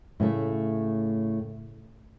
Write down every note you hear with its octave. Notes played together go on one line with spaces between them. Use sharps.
A2 C#3 A3